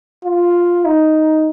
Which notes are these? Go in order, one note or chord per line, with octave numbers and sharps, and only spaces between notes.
F4
D#4